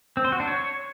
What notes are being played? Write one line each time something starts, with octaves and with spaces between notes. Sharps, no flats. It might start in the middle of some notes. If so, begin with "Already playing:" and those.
C4
C5
F#4
D4
C#5